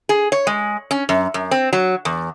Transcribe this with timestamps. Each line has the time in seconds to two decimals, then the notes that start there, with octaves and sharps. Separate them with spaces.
0.09 G#4
0.32 C#5
0.47 G#3
0.91 C#4
1.09 F#2
1.34 F#2
1.51 C4
1.73 F#3
2.05 E2